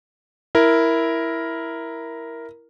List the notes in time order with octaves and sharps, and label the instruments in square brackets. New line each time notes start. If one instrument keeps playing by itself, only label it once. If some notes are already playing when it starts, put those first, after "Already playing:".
[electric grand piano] E4 A#4